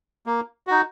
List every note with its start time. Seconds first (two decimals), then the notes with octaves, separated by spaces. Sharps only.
0.26 A#3
0.67 D#4 F#4